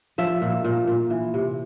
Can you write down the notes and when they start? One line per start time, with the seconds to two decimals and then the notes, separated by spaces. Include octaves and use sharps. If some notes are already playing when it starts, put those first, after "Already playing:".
0.18 F3 E5
0.42 A#2
0.64 A#2
0.87 A#2
1.10 E3
1.34 C3